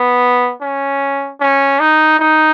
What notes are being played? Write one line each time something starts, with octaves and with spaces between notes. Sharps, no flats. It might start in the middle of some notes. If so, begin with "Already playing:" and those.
Already playing: B3
C#4
C#4
D#4
D#4